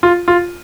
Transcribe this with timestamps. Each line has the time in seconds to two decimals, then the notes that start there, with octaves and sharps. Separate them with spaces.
0.03 F4
0.28 F4